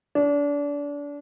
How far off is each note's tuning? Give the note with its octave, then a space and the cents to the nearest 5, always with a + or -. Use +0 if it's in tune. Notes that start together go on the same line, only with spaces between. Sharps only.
D4 -30